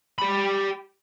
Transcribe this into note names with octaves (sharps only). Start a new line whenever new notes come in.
G4 B5